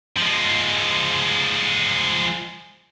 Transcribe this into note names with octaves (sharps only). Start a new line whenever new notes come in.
F3 G#3